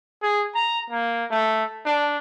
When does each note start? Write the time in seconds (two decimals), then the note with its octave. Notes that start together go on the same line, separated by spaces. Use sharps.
0.23 G#4
0.55 A#5
0.90 A#3
1.31 A3
1.86 D4